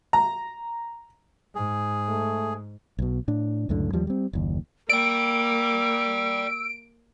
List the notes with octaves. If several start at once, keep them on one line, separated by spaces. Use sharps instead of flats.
A#5
G#2 G#4
A3
B1 B2
A2 D4
C#2 F#2 A2 D3
D#2 F3 G3
G3 C4
F#1 D#2
A#3 D5 G5 E6 D7